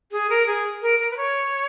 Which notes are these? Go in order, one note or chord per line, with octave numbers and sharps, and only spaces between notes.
G#4
A#4
G#4
A#4
A#4
B4
C#5